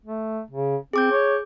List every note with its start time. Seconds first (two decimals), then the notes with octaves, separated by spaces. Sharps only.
0.06 A3
0.51 C#3
0.93 C4 G#4 D6 G6
1.11 C#5